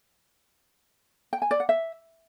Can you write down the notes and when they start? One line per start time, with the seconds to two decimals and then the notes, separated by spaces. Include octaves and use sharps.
1.33 G5
1.42 G#5
1.51 D5
1.60 F#5
1.69 E5